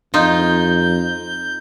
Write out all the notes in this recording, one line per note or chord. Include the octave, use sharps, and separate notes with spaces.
F2 D#4 F4 G6